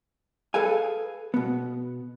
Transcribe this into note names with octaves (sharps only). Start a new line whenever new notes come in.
G#4 A4 B4 F5 G#5
B2 B3